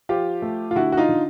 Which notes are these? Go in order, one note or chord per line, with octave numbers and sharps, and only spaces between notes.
F3 F4 G4
A3
F4
D3 E4 F#4
F#4
D#4 F4
D3